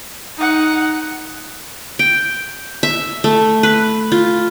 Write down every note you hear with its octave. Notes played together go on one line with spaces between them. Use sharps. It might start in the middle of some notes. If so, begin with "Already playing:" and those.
D#4 F#5
G5
E5
A3
B4
F4